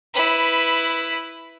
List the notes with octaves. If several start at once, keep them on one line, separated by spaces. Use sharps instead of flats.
E4 B4